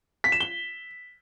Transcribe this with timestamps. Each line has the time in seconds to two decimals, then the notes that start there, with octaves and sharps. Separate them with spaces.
0.24 B6
0.32 E7
0.40 G7